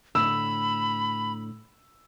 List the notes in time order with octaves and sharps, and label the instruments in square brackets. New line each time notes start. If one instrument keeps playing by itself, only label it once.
[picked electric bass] A2 D3 [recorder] B5 [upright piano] E6